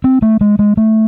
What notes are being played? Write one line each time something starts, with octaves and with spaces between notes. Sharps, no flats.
C4
A3
G#3
G#3
A3